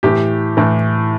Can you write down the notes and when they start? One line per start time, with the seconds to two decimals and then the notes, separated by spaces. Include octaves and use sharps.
0.03 A2 E3 G4
0.57 A2 E3